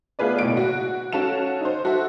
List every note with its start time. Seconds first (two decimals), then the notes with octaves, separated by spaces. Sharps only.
0.19 A3 B3 F4 G#4 B4 D5
0.39 F#1 B1 A2 D5 D7
0.57 F#4
1.12 C#4 F#4 A4 F5 E7
1.61 D#4 C5
1.85 F#4 A4 C5 E5